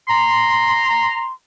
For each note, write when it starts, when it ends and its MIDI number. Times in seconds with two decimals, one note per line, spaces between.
0.08 1.32 82
0.08 1.32 84